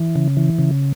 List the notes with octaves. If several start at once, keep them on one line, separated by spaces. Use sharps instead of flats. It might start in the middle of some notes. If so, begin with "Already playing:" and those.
Already playing: E3
C#3
E3
C#3